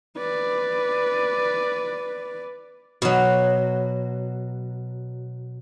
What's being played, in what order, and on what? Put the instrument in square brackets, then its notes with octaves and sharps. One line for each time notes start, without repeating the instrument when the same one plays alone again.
[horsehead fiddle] B4 D5
[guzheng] B2 F#3